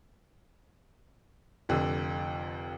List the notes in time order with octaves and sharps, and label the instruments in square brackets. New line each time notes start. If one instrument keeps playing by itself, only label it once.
[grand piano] F1 F2 D3